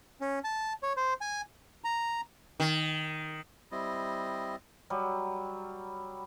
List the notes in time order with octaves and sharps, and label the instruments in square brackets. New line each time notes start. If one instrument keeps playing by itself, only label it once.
[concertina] C#4
A5
C#5
C5
G#5
[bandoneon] A#5
[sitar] D#3
[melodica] G3 C4 E4 D#5
[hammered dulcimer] F#3 G3